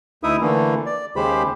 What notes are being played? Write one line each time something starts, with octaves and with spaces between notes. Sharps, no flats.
D2 D#4 E4 E5 D#6
D3 E3 A3 A#3
D5
D#2 C#3 G#3 G4 C5 B5